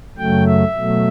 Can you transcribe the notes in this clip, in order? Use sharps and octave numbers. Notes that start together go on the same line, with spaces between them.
F#2 C#3 F#3 A3 G5
E5
B2 F#3 A3